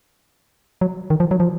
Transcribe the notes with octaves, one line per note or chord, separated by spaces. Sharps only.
F#3
D#3
F3
F#3
F3